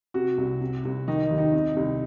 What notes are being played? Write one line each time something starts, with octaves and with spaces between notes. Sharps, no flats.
C3 F#4
C2
C3
C2
D#3 D#4
D#2
D#4
C3
C2